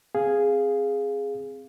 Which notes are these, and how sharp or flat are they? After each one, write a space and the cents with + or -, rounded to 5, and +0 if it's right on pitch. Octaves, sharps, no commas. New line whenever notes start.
C4 +0 G#4 +0 F5 -5